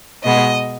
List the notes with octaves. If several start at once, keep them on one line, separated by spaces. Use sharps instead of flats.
B2 G#3 B3 D#5